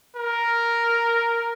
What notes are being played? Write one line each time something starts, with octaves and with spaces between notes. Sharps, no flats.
A#4